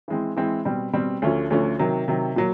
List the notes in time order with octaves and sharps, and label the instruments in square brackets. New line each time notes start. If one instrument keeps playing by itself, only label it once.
[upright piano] E3 G#3 C4
E3 G#3 C4
B2 G3 C4
B2 G3 C4
D2 D3 F3 A3 C#4
D2 D3 F3 A3 C#4
C3 D#3 F#3
C3 D#3 F#3
A#2 F#3